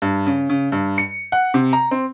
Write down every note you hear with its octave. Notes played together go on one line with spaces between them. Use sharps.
G2
C#3
C#3
G2
C#7
F#5
C3
A#5
C4